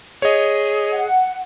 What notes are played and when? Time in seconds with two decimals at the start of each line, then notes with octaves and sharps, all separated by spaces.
0.22 G#4 C#5 D#5
0.92 F#5